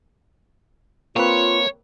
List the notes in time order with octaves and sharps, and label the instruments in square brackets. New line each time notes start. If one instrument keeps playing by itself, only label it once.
[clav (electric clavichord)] A#3 C4 B4 [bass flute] F4 [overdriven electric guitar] C#5